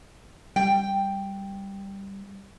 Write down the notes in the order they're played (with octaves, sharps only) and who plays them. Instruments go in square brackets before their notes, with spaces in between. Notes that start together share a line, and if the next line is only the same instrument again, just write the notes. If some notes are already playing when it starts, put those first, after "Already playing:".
[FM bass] G3 [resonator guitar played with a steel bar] G5